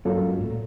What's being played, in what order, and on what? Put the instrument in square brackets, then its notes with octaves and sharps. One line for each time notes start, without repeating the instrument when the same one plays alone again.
[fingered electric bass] G2 [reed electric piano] F#3 A#3 C#4 F4 A4
[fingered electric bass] G#2
A2
A#2